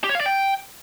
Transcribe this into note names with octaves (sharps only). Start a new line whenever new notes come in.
G4
C#5
F5
D5
G5